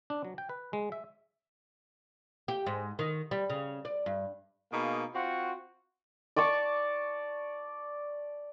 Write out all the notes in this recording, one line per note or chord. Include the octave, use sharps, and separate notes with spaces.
D4
F#3
G5
B4
G#3
E5
G4
G#2
D#3
G3
C#3
D5
G2
B2 A#3 D#4 G#4 F5
C4 F4 F#4
D5 A5 C#6 D6